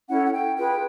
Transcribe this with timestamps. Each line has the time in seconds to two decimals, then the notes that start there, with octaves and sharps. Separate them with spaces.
0.08 C#4 E4 A4 F#5
0.26 F#5
0.32 G5
0.57 F4 G#4 B4 G5